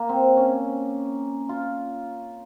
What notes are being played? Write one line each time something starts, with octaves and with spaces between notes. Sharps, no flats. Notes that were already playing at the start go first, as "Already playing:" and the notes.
Already playing: A#3
C4
C#4
F4